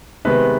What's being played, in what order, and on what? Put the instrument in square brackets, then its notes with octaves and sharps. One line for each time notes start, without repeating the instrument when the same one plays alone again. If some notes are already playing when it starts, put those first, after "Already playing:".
[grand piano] C3 D#3 G#3 B3 B4